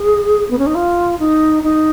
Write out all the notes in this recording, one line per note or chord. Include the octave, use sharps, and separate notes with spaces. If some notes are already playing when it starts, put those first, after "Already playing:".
Already playing: G#4
B3
C#4
D#4
F4
D#4
D#4